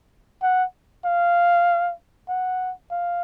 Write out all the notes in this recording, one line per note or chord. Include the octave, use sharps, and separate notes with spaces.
F#5
F5
F#5
F5